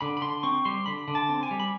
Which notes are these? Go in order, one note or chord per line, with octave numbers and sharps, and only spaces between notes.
D3 B5
B5
D3 C6
C4 C#6
G3 C6
D3 B5
D3
A5
C4
G#5
G3
B5